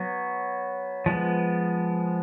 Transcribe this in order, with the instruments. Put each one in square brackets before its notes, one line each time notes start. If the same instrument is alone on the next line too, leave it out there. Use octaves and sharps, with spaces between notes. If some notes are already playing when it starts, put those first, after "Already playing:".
Already playing: [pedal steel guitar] F#3 B3
F3 G#3 B3